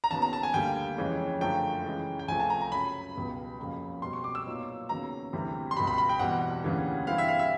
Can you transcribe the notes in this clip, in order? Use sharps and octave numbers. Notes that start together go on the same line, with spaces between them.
A#5
D#2 C#3 F#3 B3 A5
A#5
A5
G#5
D2 D3 G3 A#3 G5
F2 C#3 E3 G#3 C#4
F#2 D3 F3 A3 G5
C#3 E3 G#3
G5
C#2 C3 F3 A3 G#5
A5
A#5
A#5
F#2 C#3 F#3 B5
C#2 B2 G3 B3
F2 C#3 F#3 A#3
B2 G3 C4 C6
C#6
D6
E6
A#2 F#3 B3 D#4
D#2 C#3 F#3 B3 A#5
D2 C3 E3 G3 C4
C6
C#2 B2 G3 B5
B5
B5
G5
E2 B2 G3 C4 F#5
D2 C#3 E3 G3 A#3
G2 E3 G3 C4 E4 F5
E5
F5
E5